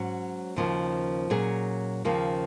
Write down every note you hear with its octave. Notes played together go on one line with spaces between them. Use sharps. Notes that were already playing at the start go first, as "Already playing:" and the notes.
Already playing: G#2 F#3 C#4 F#4
D#2 C#3 F3 A#3
A#2 F#3 C#4 G#4
D#2 C#3 F3 A#3